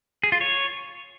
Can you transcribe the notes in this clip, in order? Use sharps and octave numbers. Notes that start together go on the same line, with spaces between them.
G#4
F4
C#5